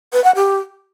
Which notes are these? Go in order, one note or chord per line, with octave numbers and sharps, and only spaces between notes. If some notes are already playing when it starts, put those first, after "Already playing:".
B4
F#5
G4